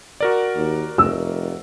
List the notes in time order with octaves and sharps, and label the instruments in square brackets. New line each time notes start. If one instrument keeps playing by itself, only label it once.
[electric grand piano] F#4 A#4 D5
[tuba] D#2
[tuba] F1 [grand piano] E6